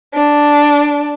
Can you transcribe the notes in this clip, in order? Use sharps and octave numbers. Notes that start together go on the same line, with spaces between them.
D4